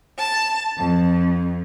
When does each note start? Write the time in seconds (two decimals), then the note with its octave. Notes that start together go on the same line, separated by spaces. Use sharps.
0.18 A5
0.77 F2